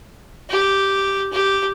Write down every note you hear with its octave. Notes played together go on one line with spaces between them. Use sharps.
G4
G4